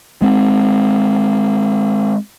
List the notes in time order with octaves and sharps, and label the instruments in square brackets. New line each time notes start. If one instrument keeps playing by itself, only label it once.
[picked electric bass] G#3 C4